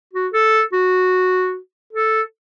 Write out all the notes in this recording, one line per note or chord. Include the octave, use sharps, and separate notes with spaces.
F#4
A4
F#4
A4